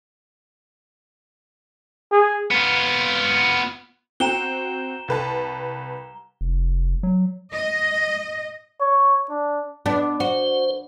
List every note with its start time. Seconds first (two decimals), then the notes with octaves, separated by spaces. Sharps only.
2.12 G#4
2.51 B3 F4
4.20 C4 F#4 G5 A#5 E7 G7
5.08 C2 B4 A5
6.41 F1
7.03 F#3
7.53 D#5
8.80 C#5
9.29 D4
9.86 B3 D4
10.20 F#4 C5